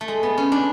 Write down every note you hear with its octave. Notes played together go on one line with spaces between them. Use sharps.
A3
G#3
B3
C#4
D4